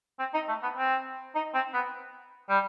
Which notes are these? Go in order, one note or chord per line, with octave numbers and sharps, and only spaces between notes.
C4
D#4
A3
B3
C4
D#4
C4
B3
G3